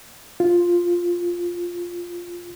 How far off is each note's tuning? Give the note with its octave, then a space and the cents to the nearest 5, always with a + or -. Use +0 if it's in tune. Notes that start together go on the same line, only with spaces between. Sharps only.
F4 +0